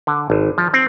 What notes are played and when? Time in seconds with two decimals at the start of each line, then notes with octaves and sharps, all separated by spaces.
0.07 D3
0.30 G#1
0.58 F3
0.74 C4